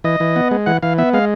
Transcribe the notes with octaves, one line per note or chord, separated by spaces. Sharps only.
E3 D#5
E3
B3
G#3
E3 F#5
E3 F5
B3 E5
G#3 F5